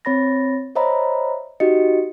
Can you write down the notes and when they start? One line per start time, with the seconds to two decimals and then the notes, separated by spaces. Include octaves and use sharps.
0.05 C4 C#5 B5 A6 A#6
0.76 C5 C#5 D#5 E5 A#5 B5
1.60 D#4 F#4 G4 D#5 C#7